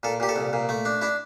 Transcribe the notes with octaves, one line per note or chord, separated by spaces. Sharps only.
A#2 A4
A#2 G4
A4
C2
A#2
A3
D4
D4 E4